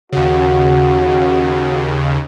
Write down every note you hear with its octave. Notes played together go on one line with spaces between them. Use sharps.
D#2 C#3 F#4